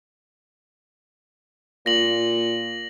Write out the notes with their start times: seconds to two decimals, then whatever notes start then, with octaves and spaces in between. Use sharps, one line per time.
1.86 A#2 A#6 F#7